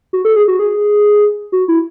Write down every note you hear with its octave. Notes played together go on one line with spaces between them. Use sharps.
F#4
A4
G#4
F#4
G#4
F#4
E4